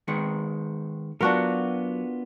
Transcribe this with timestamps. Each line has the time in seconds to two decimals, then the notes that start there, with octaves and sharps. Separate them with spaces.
0.08 D#3 G#3 B3
1.21 F#3 B3 D4 F4 F#4 A#4